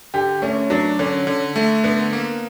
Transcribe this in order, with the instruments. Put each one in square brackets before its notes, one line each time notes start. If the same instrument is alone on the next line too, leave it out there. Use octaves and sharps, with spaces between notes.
[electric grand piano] D3 [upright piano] G4
[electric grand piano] A3 [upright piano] C#4
[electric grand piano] F#3 [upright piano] D4
[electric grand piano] D3 [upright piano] C#4
[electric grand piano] D3
A3
[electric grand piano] D3 [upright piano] B3
[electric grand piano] A#3